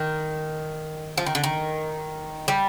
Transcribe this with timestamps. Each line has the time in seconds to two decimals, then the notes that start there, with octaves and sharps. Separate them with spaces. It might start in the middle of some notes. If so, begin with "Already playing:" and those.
Already playing: D#3
1.17 F3
1.27 D#3
1.35 D3
1.44 D#3
2.48 G3